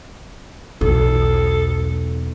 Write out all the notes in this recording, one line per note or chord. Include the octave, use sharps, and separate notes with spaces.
B1 E2 A4